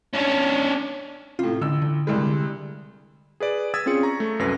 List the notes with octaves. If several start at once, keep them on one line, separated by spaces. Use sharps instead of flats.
C#4 D4
A2 C3 F4
A1 D3 E6
D3
C2 G3 G#3
D3
G#4 B4 D5
D#6 E6 G#6 A6 B6
C4 C#4 F4 G#4 C#7
A#5 C#6 A#6
A3
C2 F#2 A4 B4 A#6